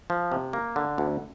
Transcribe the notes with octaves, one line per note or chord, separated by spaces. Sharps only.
F3
C3
A#3
D3
D2